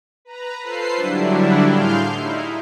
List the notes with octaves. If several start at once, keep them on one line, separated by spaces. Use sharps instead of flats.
B4 A#5
F4 A4 B4 C5 C7
D3 F#3 G3 D4 E4
A2 G#4 F5 C6 F6 G6
D#4 E4